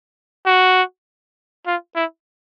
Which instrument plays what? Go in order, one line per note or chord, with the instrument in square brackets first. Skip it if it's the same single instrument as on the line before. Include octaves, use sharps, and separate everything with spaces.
[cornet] F#4
F4
E4